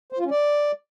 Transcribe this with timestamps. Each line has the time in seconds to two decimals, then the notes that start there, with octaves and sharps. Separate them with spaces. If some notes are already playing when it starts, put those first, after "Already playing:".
0.12 C5
0.19 F4
0.25 C#4
0.31 D5